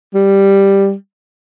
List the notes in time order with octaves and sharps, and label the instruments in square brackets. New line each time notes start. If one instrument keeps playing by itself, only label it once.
[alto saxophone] G3